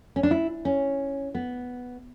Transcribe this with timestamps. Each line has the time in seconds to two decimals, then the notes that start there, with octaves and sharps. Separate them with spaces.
0.16 C#4
0.23 D4
0.31 E4
0.65 C#4
1.35 B3